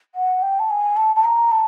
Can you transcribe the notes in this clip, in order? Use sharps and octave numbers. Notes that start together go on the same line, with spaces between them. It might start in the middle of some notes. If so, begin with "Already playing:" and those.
F#5
G5
A5
G#5
A5
A5
A#5
A5